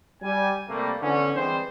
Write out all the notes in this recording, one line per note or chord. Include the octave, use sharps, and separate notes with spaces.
G3 G#5
C3 G3 A3 A#3
D3 E3 B3 C#4
E3 G3 G#3 C4 C5